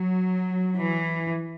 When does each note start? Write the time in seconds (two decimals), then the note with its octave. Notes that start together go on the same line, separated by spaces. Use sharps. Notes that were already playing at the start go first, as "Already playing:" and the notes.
Already playing: F#3
0.78 E3